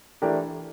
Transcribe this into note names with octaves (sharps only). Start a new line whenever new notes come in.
E3 A3 D4 G4 A#4